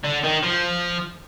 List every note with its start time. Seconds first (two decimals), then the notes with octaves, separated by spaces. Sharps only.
0.04 D3
0.24 D#3
0.43 F3